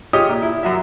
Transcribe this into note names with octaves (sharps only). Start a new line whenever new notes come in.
F4 G4 G#4 C#5 D#5 D#6
A#2
E4
F#2 F#3 E5